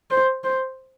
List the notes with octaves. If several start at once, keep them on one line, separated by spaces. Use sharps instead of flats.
C5
C5